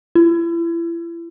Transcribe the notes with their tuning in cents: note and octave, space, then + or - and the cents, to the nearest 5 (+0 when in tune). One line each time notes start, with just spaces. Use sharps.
E4 +35